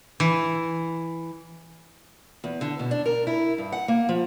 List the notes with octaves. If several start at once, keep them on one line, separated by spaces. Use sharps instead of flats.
E3
E2
D3
B2
D4
A#4
E4
G2
F#5
A#3
F3